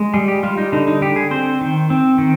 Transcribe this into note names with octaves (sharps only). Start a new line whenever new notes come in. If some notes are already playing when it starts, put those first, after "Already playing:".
Already playing: G#3
G3 G#4
G4
G3 F4
D#4
D3 D#4
D#4
D3 G4
G#4
C4 C5
D#3
C4
D#3